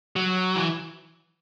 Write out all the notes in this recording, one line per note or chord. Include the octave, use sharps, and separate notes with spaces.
F#3
E3